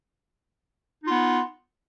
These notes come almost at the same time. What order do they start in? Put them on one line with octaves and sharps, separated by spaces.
D#4 F4 B3